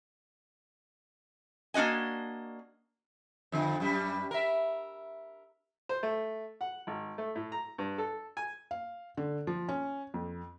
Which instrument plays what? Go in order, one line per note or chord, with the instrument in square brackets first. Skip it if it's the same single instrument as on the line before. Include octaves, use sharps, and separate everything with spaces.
[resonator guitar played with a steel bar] A#3 D4 F#4 D#5 G#5
[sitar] F2 D3
F#2 G3
A#4 E5
[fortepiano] C5
A3
F#5
G#1
A3
A2
A#5
G2
A4
G#5
[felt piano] F5
D3
F3
C#4
F2